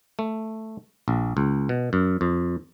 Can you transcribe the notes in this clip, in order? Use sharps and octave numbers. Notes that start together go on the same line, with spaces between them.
A3
A#1
C#2
B2
F#2
F2